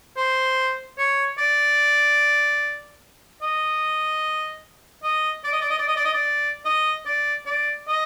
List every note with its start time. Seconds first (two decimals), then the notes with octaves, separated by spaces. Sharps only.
0.17 C5
0.98 C#5
1.38 D5
3.42 D#5
5.03 D#5
5.44 D5
5.52 D#5
5.61 D5
5.70 D#5
5.79 D5
5.88 D#5
5.96 D5
6.05 D#5
6.14 D5
6.65 D#5
7.06 D5
7.46 D5
7.88 D#5